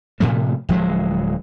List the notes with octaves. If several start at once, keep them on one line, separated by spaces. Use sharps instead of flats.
A2 C3 F3 A3
D1 F3 F#3 G#3